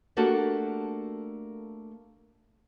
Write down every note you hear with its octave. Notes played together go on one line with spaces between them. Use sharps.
A3 A#3 D4 F#4 G4 A4